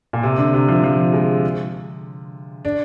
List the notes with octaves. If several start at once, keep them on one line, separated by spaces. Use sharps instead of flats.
A#2
C3
D3
C3
F3
F3
G#3
D4